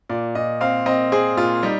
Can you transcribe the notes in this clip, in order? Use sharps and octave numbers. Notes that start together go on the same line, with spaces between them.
A#2 D5
A#2 D#5
C4 F5
C4 D#5
C4 G#4
A#2 F4
G3 D#4